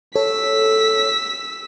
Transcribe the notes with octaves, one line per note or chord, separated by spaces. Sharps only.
A4 C#5 E6 B6